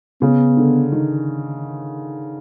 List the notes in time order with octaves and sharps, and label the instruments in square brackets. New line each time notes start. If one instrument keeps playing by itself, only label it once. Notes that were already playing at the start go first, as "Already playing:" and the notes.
[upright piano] C#3 [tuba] B3
[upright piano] D3
D#3